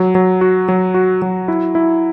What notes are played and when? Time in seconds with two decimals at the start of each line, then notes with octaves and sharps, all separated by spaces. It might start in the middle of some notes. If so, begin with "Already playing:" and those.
Already playing: F#3
0.15 F#3
0.41 F#4
0.69 F#3
0.94 F#4
1.22 F#3
1.48 E4
1.75 E4